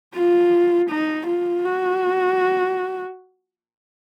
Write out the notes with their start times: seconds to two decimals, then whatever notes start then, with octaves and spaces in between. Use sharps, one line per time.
0.14 F4
0.90 D#4
1.27 F4
1.65 F#4